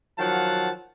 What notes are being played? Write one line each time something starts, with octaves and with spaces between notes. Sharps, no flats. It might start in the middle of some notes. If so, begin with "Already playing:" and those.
D#3 F3 F#3 F5 F#5 A5